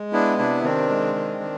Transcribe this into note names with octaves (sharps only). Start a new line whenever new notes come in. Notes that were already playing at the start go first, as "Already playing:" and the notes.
Already playing: G#3
B3 D4 E4
C3 D4 E4
D#3 C4 D4
G#3
D#3
D#3